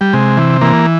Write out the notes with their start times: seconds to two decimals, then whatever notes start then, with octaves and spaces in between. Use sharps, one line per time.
0.01 G3
0.13 C3 G#3
0.37 E3
0.61 E3 A#3